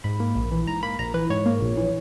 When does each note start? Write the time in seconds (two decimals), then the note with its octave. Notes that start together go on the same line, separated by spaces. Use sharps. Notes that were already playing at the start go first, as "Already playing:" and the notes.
0.04 G#2 B5
0.20 A#3
0.35 A#1
0.51 E3
0.67 G#2 A#5
0.83 A#3 B5
0.99 A#1 A#5
1.14 E3 B4
1.30 G#2 C#5
1.46 A#3
1.61 A#1
1.77 E3